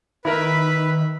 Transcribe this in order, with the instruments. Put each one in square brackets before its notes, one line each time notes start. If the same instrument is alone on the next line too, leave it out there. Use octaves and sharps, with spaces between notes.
[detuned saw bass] D#3 [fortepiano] E4 A#4 [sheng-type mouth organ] B4 [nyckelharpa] E5 B5